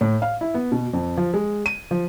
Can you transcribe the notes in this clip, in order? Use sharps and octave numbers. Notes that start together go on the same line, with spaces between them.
A2
F5
E4
B3
B2
F2
F3
G#3
D#7
F3